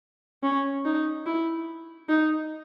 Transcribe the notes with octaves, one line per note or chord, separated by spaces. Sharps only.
C#4
D#4
E4
D#4